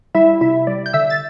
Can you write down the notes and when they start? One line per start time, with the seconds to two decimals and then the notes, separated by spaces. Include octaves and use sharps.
0.15 G3 E4 E5
0.41 C3 E4 E5
0.67 G3 D5
0.86 G6
0.93 D3 E5 E6
1.10 A6